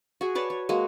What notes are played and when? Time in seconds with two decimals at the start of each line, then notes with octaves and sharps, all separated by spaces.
0.21 F#4 G#4
0.35 B4 C#5 D5 A5
0.50 C#5
0.69 G#3 A#3 F#4